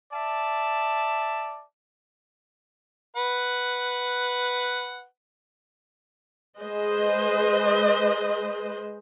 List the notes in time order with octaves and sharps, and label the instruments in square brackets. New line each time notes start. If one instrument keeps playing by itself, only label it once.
[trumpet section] D5 E5 A5
[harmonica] B4 F#5
[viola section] G#3 G#4 B4 C5 D#5